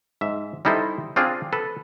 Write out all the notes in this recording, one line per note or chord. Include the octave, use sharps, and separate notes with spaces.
G#2 E5
G3 D#4 E4 A4 C5
C4 D4 F4 G#4
A4 B4